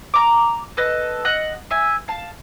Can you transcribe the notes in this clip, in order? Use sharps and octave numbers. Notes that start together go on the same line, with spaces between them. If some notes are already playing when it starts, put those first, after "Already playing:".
A#5 D6
A4 B4 D#5
D#5 F#5
E5 G#5
F5 A5